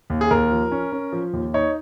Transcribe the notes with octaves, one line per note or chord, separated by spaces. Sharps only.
D#2
G#4
D#2 A#4
F3
C#4
C#4
F3
D#2
D#4 C#5